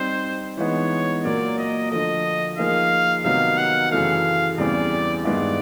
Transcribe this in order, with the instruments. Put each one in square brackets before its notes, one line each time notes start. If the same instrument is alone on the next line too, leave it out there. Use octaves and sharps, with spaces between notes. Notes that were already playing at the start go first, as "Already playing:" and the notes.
Already playing: [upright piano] G3 C4 D#4 [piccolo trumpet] C5
[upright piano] E3 G#3 B3 D#4 [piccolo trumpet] C#5
[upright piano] A#2 F#3 A#3 [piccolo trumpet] D5
[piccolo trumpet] D#5
[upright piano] D3 F3 A3 [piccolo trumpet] D#5
[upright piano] F3 A#3 D#4 G#4 [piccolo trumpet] F5
[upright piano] C3 D#3 F#3 B3 D#4 [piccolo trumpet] F5
[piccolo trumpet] F#5
[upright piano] F#2 C#3 E3 A3 [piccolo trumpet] F5
[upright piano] E2 C#3 E3 G3 C4 [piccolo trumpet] D5
[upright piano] G2 D#3 G#3 B3 E4 [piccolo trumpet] D5